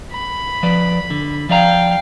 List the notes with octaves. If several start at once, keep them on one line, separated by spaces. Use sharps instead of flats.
B5
F3 B4 D5
D3
F3 D5 F5 G5 A#5